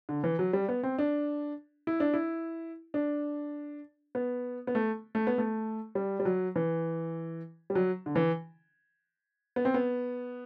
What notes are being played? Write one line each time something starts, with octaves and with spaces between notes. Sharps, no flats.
D3
E3
F#3
G3
B3
C4
D4
E4
D4
E4
D4
B3
B3
A3
A3
B3
A3
G3
G3
F#3
E3
G3
F#3
D3
E3
B3
C4
B3